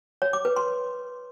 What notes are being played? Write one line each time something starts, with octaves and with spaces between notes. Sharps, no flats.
C#5
D6
B4
C6